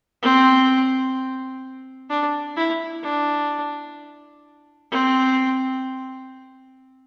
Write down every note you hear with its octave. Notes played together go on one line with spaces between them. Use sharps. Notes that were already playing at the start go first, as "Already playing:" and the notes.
C4
D4
E4
D4
C4